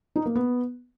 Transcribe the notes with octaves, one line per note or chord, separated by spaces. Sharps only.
D#4
A#3
B3